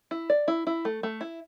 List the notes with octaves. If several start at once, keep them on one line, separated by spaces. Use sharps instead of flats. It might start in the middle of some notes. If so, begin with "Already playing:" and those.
E4
D5
E4
E4
A3
A3
E4